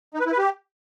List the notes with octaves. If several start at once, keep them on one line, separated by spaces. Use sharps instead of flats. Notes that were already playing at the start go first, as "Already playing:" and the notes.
D#4
B4
E4
B4
G4